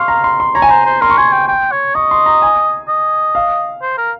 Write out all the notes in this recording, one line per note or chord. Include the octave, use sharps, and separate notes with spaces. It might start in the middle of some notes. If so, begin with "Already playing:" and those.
Already playing: F5 C6 C#6
A#5
C6
C6
C#5 A#5
G#5
C5 A#5
C5
A#4 C6
C#6
G#5 C6
G5
G5
C#5
D#5 C#6
C6
A#5
G#5
D#5
F5
C5
A#4